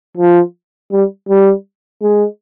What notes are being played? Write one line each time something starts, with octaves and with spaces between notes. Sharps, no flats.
F3
G3
G3
G#3